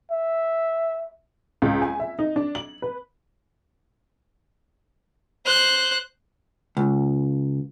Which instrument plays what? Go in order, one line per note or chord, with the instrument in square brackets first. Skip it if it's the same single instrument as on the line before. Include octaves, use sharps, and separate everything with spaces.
[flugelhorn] E5
[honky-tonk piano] C#2
G#5
E5
D#4
D4
F#7
B4
[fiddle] C5 F#6
[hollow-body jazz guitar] C#2